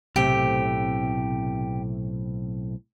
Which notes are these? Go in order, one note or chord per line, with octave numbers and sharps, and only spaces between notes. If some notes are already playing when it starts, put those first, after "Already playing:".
B1 A2 C3 C4 G4